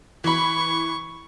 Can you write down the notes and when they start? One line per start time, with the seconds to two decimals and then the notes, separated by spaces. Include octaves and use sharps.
0.24 E3 B5 C#6